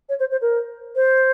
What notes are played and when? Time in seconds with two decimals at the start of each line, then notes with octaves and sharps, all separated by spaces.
0.09 C#5
0.19 C5
0.31 C5
0.41 A#4
0.95 C5